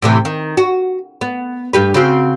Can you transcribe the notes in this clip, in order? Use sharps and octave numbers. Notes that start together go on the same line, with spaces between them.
A2 C3 E3
D#3
F#4
B3
G2 G4 B4
C#3 C4 F#4